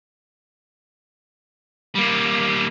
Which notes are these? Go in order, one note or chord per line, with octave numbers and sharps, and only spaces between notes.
G3 A#3